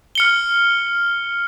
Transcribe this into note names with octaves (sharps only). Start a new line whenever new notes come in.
F6 C#7 G7